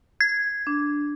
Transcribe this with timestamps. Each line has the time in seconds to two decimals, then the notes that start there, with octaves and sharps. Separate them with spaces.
0.21 G#6
0.67 D4